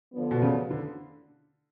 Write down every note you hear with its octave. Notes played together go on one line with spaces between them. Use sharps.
D3 F3 B3 D4
B2
C#3
D3